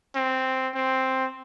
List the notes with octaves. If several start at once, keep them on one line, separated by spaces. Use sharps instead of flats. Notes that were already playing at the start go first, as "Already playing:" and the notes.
C4
C4